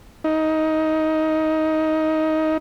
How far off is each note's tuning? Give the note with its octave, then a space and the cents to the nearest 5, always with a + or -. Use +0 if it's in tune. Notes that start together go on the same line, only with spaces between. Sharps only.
D#4 +15